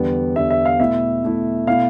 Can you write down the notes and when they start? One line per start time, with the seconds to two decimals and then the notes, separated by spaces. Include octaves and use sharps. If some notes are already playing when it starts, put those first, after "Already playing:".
Already playing: E2 D3 G3 B3
0.36 E2 D3 G3 B3 E5
0.50 E5
0.65 F5
0.80 B2 A3 E4 E5
1.23 B2 A3 E4
1.67 B2 A3 E4 F5